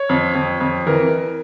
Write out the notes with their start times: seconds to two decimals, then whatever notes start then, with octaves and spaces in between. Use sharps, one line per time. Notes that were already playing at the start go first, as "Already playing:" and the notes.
Already playing: C#5
0.09 F2
0.35 F2
0.61 F2
0.87 E3 A#4